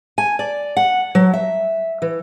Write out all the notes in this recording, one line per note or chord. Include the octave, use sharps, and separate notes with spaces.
G#5
D5
F#5
F#3
E5
E3